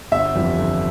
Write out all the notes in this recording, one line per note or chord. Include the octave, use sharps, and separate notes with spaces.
G1 E5
F2 E3 G3
G1